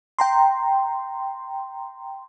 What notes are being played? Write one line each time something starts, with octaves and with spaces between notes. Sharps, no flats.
G5 A#5 C6